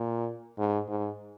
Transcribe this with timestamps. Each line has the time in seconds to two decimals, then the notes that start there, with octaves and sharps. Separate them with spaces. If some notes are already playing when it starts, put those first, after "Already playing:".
Already playing: A#2
0.58 G#2
0.89 G#2